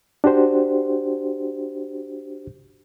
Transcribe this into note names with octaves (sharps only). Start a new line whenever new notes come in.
D4 F#4 G4 C5